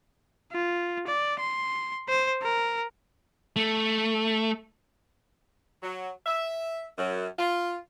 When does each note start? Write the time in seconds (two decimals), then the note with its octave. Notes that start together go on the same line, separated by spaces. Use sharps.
0.52 F4
1.07 D5
1.39 C6
2.09 C5
2.42 A#4
3.56 A3
5.83 F#3
6.26 E5
6.98 F#2
7.39 F4